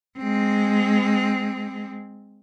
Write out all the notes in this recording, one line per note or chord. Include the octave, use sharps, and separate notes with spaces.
G#3 C4